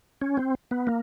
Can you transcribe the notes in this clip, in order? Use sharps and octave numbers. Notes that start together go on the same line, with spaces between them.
C#4
C4
B3
A#3